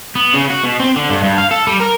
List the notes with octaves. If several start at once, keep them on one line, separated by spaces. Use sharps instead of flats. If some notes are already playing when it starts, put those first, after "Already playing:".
B3
C#3
F#4
B2
C4
D3
G2
G2
F5
A4
G3
A#4